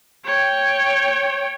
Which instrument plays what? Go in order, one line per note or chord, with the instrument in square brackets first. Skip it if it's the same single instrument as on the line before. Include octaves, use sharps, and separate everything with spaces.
[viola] C#5 G5